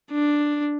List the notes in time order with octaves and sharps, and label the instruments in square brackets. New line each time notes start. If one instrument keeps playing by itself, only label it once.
[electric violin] D4